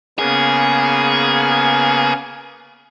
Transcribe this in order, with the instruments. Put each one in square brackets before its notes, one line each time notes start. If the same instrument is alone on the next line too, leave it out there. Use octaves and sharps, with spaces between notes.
[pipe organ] C#3 A#3 B3 [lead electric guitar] G#4